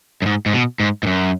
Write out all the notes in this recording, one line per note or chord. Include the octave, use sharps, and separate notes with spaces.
F#2
G#2
G#2
B2
G#2
G#2
F#2